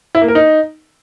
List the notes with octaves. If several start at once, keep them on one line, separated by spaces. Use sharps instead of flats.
E4
A#3
A#4
D#4